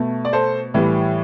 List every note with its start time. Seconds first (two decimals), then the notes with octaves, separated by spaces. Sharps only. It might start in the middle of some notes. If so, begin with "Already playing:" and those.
Already playing: B2 A3
0.25 D5
0.33 A4 C5
0.74 A2 E3 G3